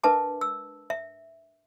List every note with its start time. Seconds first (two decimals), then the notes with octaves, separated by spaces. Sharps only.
0.04 D4 A#4 B4 E5 A5 D6
0.41 E6
0.90 E5